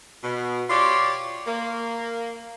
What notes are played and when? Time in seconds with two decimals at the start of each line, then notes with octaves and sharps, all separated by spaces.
0.24 B2
0.70 F4 G4 C#5 D5
1.47 A#3